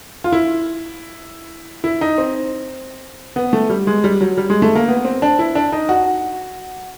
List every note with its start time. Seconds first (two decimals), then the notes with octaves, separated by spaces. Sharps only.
0.24 F4
0.32 E4
1.84 E4
2.01 D#4
2.18 C4
3.36 B3
3.53 A3
3.70 G3
3.87 G#3
4.04 G3
4.21 F#3
4.37 G3
4.50 G#3
4.62 A3
4.76 A#3
4.88 B3
5.05 C4
5.22 D4
5.39 E4
5.55 D4
5.72 D#4
5.89 F#4